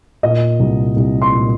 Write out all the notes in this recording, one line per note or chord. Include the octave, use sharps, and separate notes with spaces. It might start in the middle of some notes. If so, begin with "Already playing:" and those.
A#2 D#5
C2
C2
C6
A#2